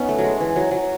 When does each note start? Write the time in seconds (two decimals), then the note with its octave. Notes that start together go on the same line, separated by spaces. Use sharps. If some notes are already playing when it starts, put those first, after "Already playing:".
Already playing: B3 C#4 D#4
0.09 A3
0.18 F#3
0.25 G#3
0.41 E3
0.56 F#3
0.71 F#3